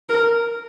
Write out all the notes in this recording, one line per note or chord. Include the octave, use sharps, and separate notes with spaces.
A#4